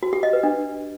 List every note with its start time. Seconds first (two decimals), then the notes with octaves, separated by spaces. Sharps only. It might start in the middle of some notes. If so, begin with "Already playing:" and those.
0.03 F#4
0.13 G4
0.23 D#5
0.33 B4
0.43 D4